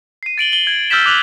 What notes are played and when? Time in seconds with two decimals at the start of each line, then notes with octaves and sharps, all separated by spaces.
0.23 C7 D#7
0.38 A6 D7 F#7 G7
0.52 F#7 G7
0.67 G#6
0.90 E6 F6 G6 A6 B6 E7
1.06 D6 E6 F#6 F7 F#7